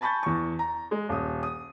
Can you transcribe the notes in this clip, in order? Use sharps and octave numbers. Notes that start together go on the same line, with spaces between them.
G#5 A5 B5 C#6 G6 A6
E2 C#6
A#5
G#3
D#1 D#6
D#6